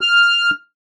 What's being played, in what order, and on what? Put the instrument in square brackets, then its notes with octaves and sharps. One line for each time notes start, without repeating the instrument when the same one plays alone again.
[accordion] F6